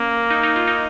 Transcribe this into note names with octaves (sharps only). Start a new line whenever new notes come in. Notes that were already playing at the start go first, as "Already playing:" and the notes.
Already playing: A#3 C#4
D#4
D#4
F4
D#4